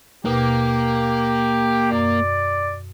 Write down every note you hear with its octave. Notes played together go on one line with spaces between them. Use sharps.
D#2 B2 A#3 G4
F#2 D5